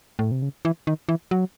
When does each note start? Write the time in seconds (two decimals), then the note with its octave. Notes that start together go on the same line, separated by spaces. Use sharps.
0.19 A2
0.31 C3
0.42 C#3
0.65 E3
0.87 D#3
1.09 E3
1.31 F#3